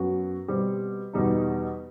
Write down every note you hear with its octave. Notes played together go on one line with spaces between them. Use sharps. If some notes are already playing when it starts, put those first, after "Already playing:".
Already playing: F#2 F#3 B3 F#4
B2 G3 C4
E2 B2 G3 D#4